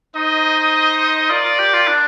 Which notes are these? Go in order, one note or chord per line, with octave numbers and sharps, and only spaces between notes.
D#4 C5 D#5
F4 A#4 D5
F4
G4
F4
D4